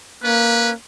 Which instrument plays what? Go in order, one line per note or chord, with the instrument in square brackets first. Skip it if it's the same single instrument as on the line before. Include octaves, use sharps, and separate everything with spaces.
[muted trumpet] A#3 [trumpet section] C#4 B4